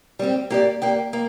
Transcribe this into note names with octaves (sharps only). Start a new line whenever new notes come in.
G3 C4 G4
A#3 G4 D5
A#3 G4 D5
A#3